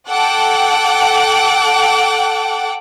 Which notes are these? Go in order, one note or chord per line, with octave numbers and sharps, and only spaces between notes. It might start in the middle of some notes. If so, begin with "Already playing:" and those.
A4 F#5 G5 D6